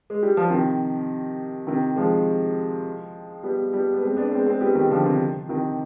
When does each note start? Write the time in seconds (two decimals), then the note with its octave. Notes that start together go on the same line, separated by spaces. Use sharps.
0.10 G#3
0.23 G3
0.37 F3
0.50 C3 D#3
1.67 C3 D#3
1.96 F3 G#3
3.43 G3 B3
3.73 G3 B3
3.94 B3
4.02 G#3 C4
4.17 B3 D4
4.32 G#3 C4
4.46 G#3 C4
4.61 G3 B3
4.75 D#3 G3
4.90 D3 F3
5.05 C3 D#3
5.49 C3 D#3